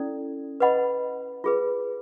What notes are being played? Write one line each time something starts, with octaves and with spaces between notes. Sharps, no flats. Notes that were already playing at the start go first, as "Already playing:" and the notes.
Already playing: C#4 E4 A4 D5
B4 D#5 F#5 B5
F4 G#4 B4